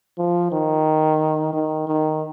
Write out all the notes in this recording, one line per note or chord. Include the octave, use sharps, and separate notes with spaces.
F3
D#3
D#3
D#3